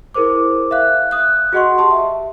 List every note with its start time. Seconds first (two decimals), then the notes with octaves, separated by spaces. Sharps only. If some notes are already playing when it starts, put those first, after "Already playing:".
0.14 E4 G#4 A#4 C5 D6
0.71 E5 F5 F#6
1.11 D#6 F#6
1.53 F#4 G#4 D#5 F#5 C6 C#6
1.78 G4 A5 C6
1.91 E5